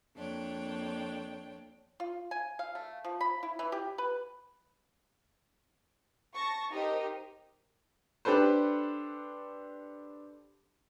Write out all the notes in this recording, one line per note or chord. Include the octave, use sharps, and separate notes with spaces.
F2 A#3 D4 C#5 G5
F4
G#5
F5
A3
F3
B5
E4
E3
G4
B4
A5 C#6 A#6
D#4 G4 A#4 C5 D#5
D4 G4 A4 B4 C5